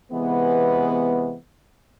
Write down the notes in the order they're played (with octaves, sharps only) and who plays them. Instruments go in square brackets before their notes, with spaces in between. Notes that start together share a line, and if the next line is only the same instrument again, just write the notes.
[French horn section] C3 E3 G#3 B3